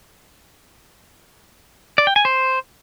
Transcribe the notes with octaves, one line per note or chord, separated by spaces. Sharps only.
D5
G5
G#5
C5